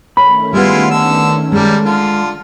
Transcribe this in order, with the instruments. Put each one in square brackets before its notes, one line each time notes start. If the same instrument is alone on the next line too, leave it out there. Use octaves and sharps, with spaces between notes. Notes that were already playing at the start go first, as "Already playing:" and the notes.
[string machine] D#3 A3 C#4 [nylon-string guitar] C#5 [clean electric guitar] B5
[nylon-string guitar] G3 B3 [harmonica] G#3 E4 F4
[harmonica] D3 E6
[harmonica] G3 A#3 [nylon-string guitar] G#3 A4
[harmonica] D3 F4